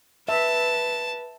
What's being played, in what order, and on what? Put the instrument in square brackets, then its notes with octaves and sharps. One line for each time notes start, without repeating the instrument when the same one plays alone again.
[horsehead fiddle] B4 [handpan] E5 [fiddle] A5